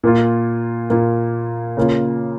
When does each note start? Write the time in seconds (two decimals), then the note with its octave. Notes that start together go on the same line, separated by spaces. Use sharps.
0.03 A#2 A#3 F4
0.90 A#2 A#3 F4
1.77 C#3 A#3 F4